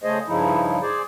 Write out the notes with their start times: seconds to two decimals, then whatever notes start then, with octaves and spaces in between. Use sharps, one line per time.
0.03 C#3 A3 G#4 C5 D#5
0.27 G2 C#3 F3 D#4 E4
0.81 G#4 C5 D5